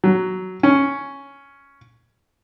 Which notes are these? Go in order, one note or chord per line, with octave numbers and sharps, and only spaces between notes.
F#3
C#4